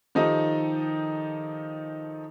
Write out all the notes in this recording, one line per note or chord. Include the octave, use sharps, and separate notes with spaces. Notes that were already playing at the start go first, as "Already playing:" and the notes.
D#3 F3 D#4 G4 A4 D#5